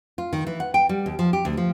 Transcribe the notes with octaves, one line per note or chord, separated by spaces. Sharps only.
F4
D#3
E3
F#5
G5
G3
D#2
F3
G4
D2
F3